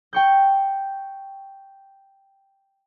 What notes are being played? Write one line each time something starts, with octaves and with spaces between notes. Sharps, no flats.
G5 C#6 G6